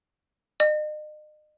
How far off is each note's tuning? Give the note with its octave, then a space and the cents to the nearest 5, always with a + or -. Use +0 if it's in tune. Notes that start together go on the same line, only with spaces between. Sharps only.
D#5 -40